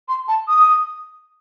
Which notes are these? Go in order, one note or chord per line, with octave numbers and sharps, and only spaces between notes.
C6
A5
D#6